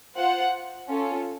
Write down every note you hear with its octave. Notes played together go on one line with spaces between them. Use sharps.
F4 C5 F#5
C#4 F4 A4